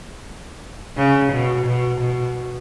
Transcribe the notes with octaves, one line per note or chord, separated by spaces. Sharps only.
C#3
B2
B2
B2